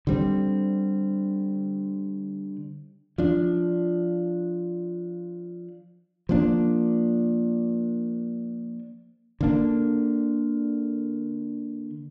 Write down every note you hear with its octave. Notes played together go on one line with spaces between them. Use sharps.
D3 G3 C4
F3 D4
F3 A#3 D4
D3 A#3 D4